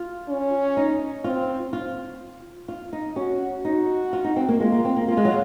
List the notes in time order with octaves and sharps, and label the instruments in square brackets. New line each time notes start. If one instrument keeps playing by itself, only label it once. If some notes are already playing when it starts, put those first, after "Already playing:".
Already playing: [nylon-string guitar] F4
[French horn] C#4
[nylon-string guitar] D#4
[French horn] C4 [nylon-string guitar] F4
[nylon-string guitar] F4
F4
D#4
[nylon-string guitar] C#4 [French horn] F#4
[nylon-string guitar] D#4 [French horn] F#4
[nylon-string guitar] F4
D#4
C4
A#3
[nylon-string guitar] G#3 [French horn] F4
[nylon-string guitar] A#3
C4
A#3
[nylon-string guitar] A#3 [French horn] F4
[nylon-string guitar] G#3
F#3